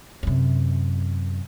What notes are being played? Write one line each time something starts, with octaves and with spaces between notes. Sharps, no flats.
F#2 C3